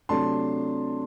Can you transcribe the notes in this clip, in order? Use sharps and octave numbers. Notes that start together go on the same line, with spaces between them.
C3 F#3 A3 D4 A5 C6